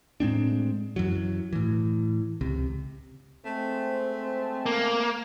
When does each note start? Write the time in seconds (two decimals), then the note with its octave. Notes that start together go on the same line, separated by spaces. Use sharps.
0.20 A2 G#3 C4 D4
0.96 F#2 E3 F#3
1.53 A2 E3
2.41 C#2 C3
3.45 G#3 A3 C4
4.66 A#3